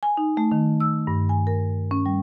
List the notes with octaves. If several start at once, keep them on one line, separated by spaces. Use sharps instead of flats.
G#5
D#4
A3
D#3
E6
G2
G#5
A#4
C#4
G3